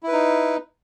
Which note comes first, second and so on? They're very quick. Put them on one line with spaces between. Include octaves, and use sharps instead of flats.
E4 B4 D#4